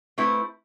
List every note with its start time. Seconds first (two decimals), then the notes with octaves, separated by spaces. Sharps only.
0.18 A3 C4 E4 B4